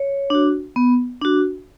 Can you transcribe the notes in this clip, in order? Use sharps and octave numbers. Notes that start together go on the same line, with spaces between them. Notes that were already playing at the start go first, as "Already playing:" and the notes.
Already playing: C#5
D4 F#4
B3
D4 F#4